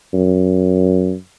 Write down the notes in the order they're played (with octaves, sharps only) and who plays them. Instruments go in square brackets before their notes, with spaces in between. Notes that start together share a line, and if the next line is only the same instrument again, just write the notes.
[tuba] F#2